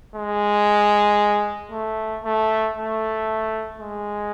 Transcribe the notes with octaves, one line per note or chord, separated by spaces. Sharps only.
G#3
A3
A3
A3
G#3